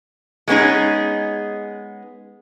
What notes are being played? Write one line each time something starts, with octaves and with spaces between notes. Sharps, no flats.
G#3 A3 B3 C#4 D#4 G#4